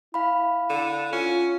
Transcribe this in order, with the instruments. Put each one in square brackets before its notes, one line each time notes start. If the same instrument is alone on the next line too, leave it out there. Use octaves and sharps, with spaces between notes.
[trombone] E4 [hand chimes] F5 B5
[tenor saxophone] D3
[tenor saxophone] C#4 [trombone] F4